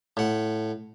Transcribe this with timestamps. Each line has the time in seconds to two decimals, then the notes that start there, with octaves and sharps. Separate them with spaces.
0.17 A2 F#5